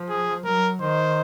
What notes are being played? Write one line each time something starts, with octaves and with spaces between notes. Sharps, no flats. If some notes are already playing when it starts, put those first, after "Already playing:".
Already playing: F3
G#4
F#3 A#4
D#3 C5